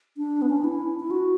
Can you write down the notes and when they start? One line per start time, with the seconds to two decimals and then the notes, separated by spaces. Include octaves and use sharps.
0.17 D4
0.42 B3
0.49 C#4
0.57 D4
0.64 E4
1.00 E4
1.11 F#4